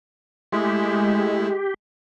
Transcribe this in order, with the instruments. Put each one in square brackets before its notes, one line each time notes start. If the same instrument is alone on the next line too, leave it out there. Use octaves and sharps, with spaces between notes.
[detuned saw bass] G#3 [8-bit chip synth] A3 E4 [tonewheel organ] G4